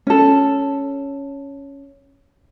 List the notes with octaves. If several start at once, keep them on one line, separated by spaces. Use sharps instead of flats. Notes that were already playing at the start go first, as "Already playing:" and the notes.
C#4 A4